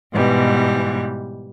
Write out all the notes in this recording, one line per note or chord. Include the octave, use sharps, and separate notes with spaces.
G#2 B2 E3 G3